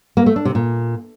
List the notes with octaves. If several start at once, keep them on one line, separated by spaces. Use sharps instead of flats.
A#3
A3
D4
C3
A#2